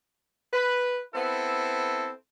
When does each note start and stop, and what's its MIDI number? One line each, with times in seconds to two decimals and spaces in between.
0.53 1.01 71
1.14 2.11 59
1.14 2.11 60
1.14 2.11 64
1.14 2.11 69